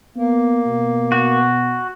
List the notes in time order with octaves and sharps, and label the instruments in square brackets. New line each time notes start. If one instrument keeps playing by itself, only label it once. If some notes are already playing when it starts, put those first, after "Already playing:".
[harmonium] A#3 [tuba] B3
[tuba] B2
[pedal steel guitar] F#4